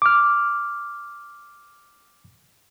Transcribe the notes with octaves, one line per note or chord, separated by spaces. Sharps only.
D6 F6